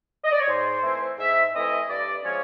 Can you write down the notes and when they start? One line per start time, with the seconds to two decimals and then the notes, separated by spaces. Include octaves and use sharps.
0.24 D#5
0.31 D5
0.40 C#5
0.47 G#2 C5
0.83 E3 A3 C4 E4
1.18 G#2 E5
1.53 E3 A3 C4 E4 D#5
1.89 G2 D5
2.24 D3 F3 G#3 C#4 C#5